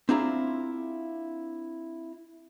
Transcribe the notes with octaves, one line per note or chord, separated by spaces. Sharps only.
C4 D4 E4 F4 G#4 A#5